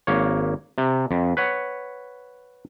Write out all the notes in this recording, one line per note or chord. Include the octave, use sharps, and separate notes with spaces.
G#1 A#3 C#5
C3
F2
B4 C#5 F#5